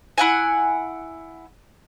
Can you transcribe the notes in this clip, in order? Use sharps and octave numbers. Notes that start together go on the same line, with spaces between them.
E4 F#5 G#5